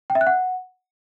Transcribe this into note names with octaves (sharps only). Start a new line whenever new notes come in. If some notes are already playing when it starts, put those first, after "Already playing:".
G5
E5
F#6
F#5